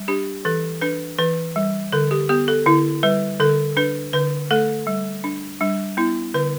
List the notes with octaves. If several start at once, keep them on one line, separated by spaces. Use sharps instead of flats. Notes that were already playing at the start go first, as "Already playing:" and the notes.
Already playing: G3
D4 G4
E3 A4
D4 B4
E3 B4
G3
D3 A4
G4
B3 G4
A4
D3 E4
G3 B4
D3 A4
D4 B4
D3 B4
A3 A4
G3
D4
G3 D4
B3 E4
D3 B4